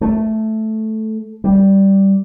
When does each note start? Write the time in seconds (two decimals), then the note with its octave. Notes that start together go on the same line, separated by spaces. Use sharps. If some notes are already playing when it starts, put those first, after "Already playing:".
0.01 A3
1.44 G3